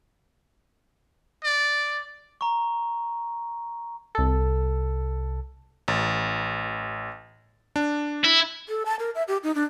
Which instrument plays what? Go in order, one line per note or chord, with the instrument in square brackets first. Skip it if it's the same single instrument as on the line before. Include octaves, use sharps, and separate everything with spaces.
[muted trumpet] D5
[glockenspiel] A#5 C#6
[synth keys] C2 A4
[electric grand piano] A1
D4
[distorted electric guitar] E4
[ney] A4
A5
A#4
E5
G4
D#4
D4